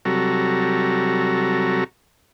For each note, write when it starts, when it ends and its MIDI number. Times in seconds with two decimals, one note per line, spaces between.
0.05 1.84 48
0.05 1.84 54
0.05 1.84 55
0.05 1.84 66
0.05 1.84 69
0.05 1.84 82